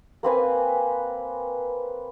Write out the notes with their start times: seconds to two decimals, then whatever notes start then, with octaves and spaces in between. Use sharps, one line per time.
0.23 A#3 C4 B4 G#5